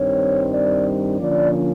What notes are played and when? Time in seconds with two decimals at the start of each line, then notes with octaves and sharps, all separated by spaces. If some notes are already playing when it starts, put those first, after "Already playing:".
Already playing: G2 D#3 G3 C4 C#5
0.53 D5
1.19 D3 F3 A#3 C#4 D5